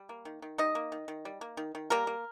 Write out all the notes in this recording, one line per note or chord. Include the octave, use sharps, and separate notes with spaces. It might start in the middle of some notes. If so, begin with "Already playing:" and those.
Already playing: G3
A#3
D#3
D#3
G3 D#4 D#5
A#3
D#3
D#3
G3
A#3
D#3
D#3
G3 A#3 A#4
A#3